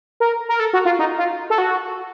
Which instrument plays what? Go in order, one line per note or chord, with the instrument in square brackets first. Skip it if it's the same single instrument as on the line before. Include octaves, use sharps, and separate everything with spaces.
[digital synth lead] A#4
A#4
A4
F#4
F4
D#4
F4
A4
F#4